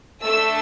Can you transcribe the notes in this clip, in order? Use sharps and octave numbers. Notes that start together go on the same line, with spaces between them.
A3 D4 A4 E6